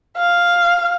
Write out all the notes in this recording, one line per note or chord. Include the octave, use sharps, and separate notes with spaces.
F5